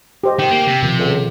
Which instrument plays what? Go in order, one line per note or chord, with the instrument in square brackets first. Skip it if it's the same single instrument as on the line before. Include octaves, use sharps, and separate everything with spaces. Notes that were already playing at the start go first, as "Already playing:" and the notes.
[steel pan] G4 C5 D#5
[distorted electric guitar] D#3 [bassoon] G4 [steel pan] G5
[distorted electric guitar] A#3
C3
[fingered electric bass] B2 D#3 F3
[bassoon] C#2 [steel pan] A4